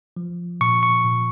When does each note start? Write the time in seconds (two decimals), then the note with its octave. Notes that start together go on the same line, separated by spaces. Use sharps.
0.16 F3
0.61 A#2 C#6
0.83 C#6
1.05 A#2